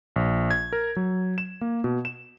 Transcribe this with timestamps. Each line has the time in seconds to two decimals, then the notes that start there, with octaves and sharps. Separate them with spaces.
0.16 A#1
0.51 G#6
0.73 A#4
0.96 F#3
1.38 E7
1.61 A#3
1.84 B2
2.05 E7